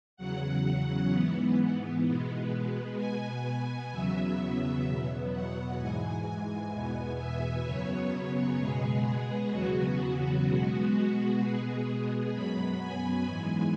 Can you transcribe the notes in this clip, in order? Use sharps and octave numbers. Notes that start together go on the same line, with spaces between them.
E2 C#3 F#3 F#5
G#2 E3 B3
B2 G#3 B3
B2 B3 G#5
E2 C#3 F#3 B3 E5
E2 B2 F#3 B3
F#5
G#2 E3 G#3 G#5
G#5
E2 B2 B3
E5
F#2 C#3 F#3 B3 C#5
B2 G#3 B3 G#4
E2 C#3 F#3 B3 F#4
B2 G#3 B3
B2 G#3 B3 G#4
F#2 F#3 B3 B5
G#5
G#2 E3 G#3 G#5